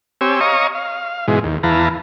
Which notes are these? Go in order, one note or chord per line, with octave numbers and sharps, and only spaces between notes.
C4 G4 C#5 G#5 E6
C#5 D#5 F5 A#5 C#6 D#6
F5
G#2 B2 E3 G#3
D#2
E2 E3 B4 F5 A5 A#5